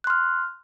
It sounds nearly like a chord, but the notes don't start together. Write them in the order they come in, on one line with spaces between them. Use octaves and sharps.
F#6 C6 F6